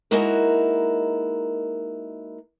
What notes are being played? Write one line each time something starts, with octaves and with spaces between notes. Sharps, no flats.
G#3 A#3 D#4 E4 F#4 A#4